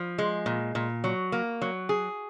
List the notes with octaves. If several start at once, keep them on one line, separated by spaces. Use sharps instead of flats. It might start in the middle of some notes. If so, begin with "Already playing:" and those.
Already playing: F3
G#3
A#2
A#2
F#3
A#3
F#3
G#4